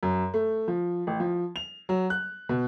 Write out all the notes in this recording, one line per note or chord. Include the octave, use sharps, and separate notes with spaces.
F#2
A3
F3
A1
F3
F7
F#3
F#6
B2